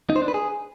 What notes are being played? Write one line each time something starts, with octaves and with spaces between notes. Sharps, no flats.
D#4
C5
D4
B4
G#4